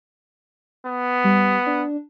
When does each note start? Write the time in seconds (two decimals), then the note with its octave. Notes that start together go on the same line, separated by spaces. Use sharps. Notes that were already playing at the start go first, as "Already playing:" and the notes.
0.86 B3
1.24 G3
1.66 D4